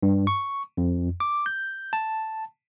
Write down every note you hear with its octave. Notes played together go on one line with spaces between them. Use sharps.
G2
C#6
F2
D6
G6
A5